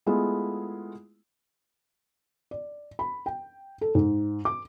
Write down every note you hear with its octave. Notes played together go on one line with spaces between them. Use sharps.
G#3 A3 B3 E4 F4 G#4
D5
B5
G5
A4
G#2
D6